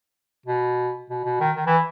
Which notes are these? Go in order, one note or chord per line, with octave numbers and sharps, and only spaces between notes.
B2
B2
B2
D#3
D#3
E3